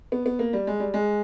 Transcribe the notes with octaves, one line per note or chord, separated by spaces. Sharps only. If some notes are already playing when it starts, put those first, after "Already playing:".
B3
B3
A#3
G3
G#3
G3
G#3